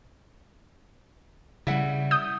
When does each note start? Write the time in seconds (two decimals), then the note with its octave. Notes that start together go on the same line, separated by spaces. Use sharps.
1.67 C#3 G3 E4 E5 F#5
2.11 D#6 G6